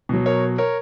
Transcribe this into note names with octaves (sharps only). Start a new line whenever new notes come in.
B2 F#3
A#4 C#5
A#4 C#5